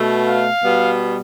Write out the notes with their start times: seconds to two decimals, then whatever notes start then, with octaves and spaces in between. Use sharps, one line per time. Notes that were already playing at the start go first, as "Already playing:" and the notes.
Already playing: B2 A3
0.27 F5
0.62 B2 G3 B3